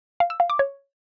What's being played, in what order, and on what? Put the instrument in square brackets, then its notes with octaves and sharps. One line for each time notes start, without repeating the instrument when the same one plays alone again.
[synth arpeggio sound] F5
E6
F5
D6
C#5